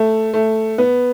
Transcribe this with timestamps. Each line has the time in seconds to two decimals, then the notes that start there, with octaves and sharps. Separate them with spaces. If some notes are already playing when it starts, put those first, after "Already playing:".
Already playing: A3
0.34 A3
0.78 B3